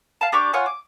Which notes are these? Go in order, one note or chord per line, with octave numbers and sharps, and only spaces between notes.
F5 A5
D4 G4 C#6 D6
F4 C#5 F#5 G#5
D6